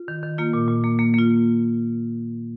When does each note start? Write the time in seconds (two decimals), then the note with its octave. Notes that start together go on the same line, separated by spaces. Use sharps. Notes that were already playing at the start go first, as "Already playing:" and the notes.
Already playing: F4
0.08 D#3
0.23 D#3
0.38 A#3 F4
0.53 A#2
0.68 A#2
0.84 A#3
0.99 A#3
1.14 A#3 F4